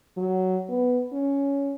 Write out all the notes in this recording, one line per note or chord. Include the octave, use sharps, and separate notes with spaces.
F#3
B3
C#4